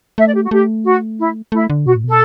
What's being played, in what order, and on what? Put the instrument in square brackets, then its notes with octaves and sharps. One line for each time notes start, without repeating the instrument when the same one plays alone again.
[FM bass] A3 [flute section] E5
[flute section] D5
G4
F#4
[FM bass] A3 [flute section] G4
[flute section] F#4
E4
[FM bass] A3 [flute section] E4
[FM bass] D3
[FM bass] B2 [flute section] F#4
[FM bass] A2
[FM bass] B2 [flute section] A4